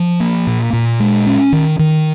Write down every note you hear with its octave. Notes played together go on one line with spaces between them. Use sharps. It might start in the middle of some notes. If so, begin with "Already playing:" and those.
Already playing: F3
A#3
A#2
A#2
G#3
C#4
D#3
D#3